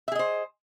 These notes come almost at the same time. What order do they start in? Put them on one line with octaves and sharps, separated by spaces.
E5 G#4 D#5 C5